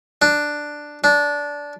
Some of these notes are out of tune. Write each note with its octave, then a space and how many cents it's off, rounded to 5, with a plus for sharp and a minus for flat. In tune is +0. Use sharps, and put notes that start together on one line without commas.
D4 +5
D4 -15